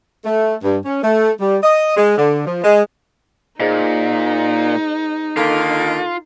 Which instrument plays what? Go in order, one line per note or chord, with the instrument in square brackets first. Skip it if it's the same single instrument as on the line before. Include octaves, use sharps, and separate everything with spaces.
[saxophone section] A3
G2
C#4
A3
G3
D#5
G#3
D3
F3
G#3
[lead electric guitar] A#2 [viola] D#4 [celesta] G#4 C5 D#5
[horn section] D3 D#3 A#3 [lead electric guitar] F4 [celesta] A4 B6